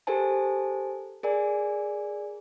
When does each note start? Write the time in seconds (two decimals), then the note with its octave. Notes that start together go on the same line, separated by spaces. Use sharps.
0.07 G4 A4 A#4 C5 G#5 A5
1.23 G#4 A#4 D5 G#5